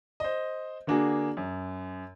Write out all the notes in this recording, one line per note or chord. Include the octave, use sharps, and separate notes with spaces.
C5 D#5
D3 A#3 D4 F#4 G#4
F#2